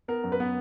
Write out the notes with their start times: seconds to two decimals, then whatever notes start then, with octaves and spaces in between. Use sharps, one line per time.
0.08 B3 A#4
0.24 F#2
0.32 B4
0.40 B3